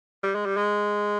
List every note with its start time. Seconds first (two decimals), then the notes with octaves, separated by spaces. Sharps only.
0.24 G3
0.35 G#3
0.46 G3
0.57 G#3